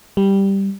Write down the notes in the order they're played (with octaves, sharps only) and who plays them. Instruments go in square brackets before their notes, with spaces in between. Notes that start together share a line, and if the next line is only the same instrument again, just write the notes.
[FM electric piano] G3